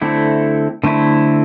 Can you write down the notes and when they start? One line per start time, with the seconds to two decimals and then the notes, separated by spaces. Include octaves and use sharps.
0.02 D3 A3 C4 E4
0.84 D3 A3 C4 E4